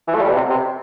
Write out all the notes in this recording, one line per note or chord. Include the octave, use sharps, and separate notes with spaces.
E3
A3
G3
B2
C3
C3